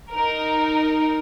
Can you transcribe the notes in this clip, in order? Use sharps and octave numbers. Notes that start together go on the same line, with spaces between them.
D#4 A#4